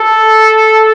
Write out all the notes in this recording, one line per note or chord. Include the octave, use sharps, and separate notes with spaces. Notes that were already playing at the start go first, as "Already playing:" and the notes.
Already playing: A4